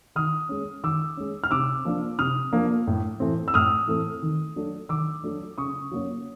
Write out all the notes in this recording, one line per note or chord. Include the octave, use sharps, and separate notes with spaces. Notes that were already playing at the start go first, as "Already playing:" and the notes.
D#3 D#6 F6
G#3 C#4
D#3 D6 E6
G#3 C#4
F6
C3 D6 E6
F3 A#3 D4
C3 D#6 F6
F3 A#3 D4
A2
E3 A3 C4
E6
A2 D#6 F6
E3 A3 C4
D#3
F#3 A3 D4
D#3 D6 E6
F#3 A3 D4
C#3 C#6 D#6
F#3 A#3 C#4